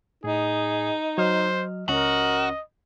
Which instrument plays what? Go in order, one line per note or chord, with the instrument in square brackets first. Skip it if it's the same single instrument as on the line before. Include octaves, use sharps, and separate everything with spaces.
[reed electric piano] A2 [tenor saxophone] D#4 [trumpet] G#4
[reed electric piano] F#3 D#5 F6 [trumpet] C5
[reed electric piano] C#2 C#4 [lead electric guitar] F#4 [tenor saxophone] A#4 [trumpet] D#5